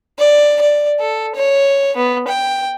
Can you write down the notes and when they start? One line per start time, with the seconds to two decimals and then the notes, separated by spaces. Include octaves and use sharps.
0.19 D5
0.61 D5
1.00 A4
1.35 C#5
1.97 B3
2.28 G5